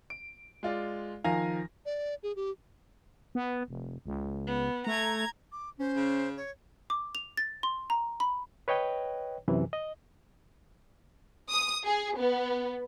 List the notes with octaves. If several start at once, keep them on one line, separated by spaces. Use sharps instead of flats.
D7
G#3 F4 D5
D#3 F3 F5 G#5 A#5 A#6
D5
G#4
G4
B3
F1
C#2
B3
A3 A#5 G#6
D6
C#4 C5
C#3
C#5
D6
F7
A6
C6
A#5
B5
B4 C#5 D#5 G5
F#2 C3 E3
D#5
D#6
G#4
B3